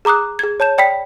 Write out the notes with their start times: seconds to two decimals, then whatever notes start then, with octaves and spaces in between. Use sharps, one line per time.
0.05 G#4 A#5 D6 D#6 F#6
0.39 G#4 G#6
0.60 C#5 A5 G6 E7
0.78 D5 G5 B5 B6